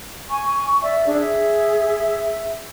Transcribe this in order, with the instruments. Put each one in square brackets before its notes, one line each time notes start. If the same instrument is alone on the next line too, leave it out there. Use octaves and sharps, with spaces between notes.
[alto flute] G#5 [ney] C#6
[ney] D5 [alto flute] E5
[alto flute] D4 [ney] G#4
[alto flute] E5